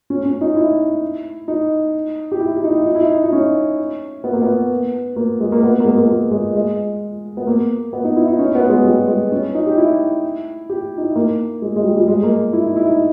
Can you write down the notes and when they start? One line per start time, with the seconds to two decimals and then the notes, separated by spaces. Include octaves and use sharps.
0.10 C#4
0.26 C#4
0.41 D#4
0.56 E4
1.48 D#4
2.32 G4
2.40 E4
2.56 G4
2.64 D#4
2.71 E4
2.86 D#4
2.95 E4
3.03 D#4
3.24 D#4
3.33 C#4
4.24 B3
4.33 A#3
4.42 B3
5.16 A#3
5.40 G#3
5.52 A#3
5.63 B3
5.80 A#3
5.85 G#3
5.97 A#3
6.08 G#3
6.31 G#3
6.55 G#3
7.37 B3
7.47 A#3
7.93 B3
8.04 D#4
8.16 E4
8.28 D#4
8.39 C#4
8.55 B3
8.69 G#3
8.85 G3
9.08 G#3
9.32 C#4
9.55 D#4
9.66 G4
9.78 E4
10.70 G4
10.98 D#4
11.04 E4
11.16 A#3
11.62 G#3
11.76 G#3
11.84 G3
11.97 G3
12.08 G#3
12.23 A#3
12.53 E4
12.66 D#4
12.76 E4
12.89 D#4